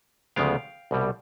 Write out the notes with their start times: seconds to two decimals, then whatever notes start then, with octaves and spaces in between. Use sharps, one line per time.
0.36 D2 C#3 F3 G#3 B3 F5 G5
0.91 C2 B2 G3